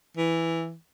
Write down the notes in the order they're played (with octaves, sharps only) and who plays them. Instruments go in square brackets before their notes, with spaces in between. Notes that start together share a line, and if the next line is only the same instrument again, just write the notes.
[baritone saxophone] E3